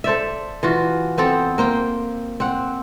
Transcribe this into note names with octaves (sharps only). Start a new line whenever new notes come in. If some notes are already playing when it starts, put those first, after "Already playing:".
A4 C5 D5 E5
E3 F4 F#4
B3 C4 A4 G5
A#3 C5 G5
C4 F#5